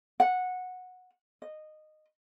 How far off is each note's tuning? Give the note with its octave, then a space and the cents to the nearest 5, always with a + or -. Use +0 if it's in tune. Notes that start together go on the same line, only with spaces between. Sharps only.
F#5 -15
D#5 -15